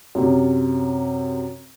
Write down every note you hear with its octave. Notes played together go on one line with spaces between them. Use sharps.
F#2 C3